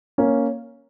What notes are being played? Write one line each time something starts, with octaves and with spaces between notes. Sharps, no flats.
A#3 C#4